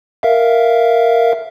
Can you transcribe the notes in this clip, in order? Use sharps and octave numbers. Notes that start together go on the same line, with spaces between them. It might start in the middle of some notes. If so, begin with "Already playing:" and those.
A#4 E5 F5